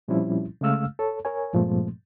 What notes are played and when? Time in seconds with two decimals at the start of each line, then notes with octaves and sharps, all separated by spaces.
0.08 A#2 F3 G3 C4 C#4 E4
0.61 C#3 G#3 A3 F5 E6 F6
0.99 A4 C#5
1.25 A#4 C#5 G#5
1.53 G2 A#2 F3 G#3 A3 C4